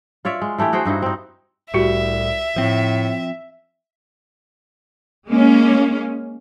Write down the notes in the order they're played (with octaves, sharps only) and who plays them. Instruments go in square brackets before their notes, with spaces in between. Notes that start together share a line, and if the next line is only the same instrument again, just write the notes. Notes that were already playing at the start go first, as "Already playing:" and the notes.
[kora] F4 C#5 D5 E5
G#3
E3 A3 E4 G4
F#4 G#4 C5 G5
G2 D#4 E4 F#4
C4 D#4
[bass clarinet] C2 [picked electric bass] A2 G3 [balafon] F#4 G4 [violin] E5
[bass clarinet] A2 [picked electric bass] F3 C4
[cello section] G#3 A#3 C#4